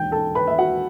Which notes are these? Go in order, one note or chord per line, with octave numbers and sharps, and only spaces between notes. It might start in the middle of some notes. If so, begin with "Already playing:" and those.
Already playing: E1 D#2 D#3 G5 G6
A4 A5
B4 B5
E5
F#4 F#5